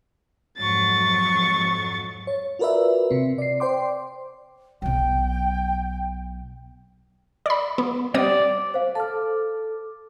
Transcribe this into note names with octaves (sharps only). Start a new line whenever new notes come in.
F2 G#2 F#3 C#6 A6
C#5
F4 F#4 A#4 B4 D5 E5
C3 C4
D5 C7
C5 D5 G5 C6 D6
B1 F#3 G5
D5 B5
B3
G3 C4 D5 D#6
C5 F5
A4 A5 D6 F6